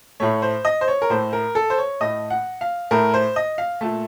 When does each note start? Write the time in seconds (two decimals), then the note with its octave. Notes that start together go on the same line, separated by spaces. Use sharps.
0.20 A2 A3 C#5
0.42 C5
0.65 D#5
0.81 C5
0.88 C#5
1.02 A#4
1.10 A2 A3 C5
1.33 A#4
1.55 A4
1.70 C5
1.78 C#5
2.00 A2 A3 D#5
2.30 F#5
2.61 F5
2.91 A2 A3 A#4
3.14 C5
3.36 D#5
3.58 F5
3.81 A#2 A3 A5